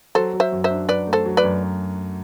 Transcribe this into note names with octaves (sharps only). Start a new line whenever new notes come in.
F#3 A4 C5
F#3
C5 E5
F#2
C5 E5
D4
F#3 B4 D5
A3
A4 C5
F#3
B4 D5
F#2